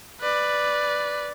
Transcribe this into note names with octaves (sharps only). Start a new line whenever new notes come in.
B4 D5